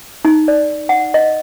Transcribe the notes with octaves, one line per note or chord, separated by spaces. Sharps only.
D#4
D5
F#5
D#5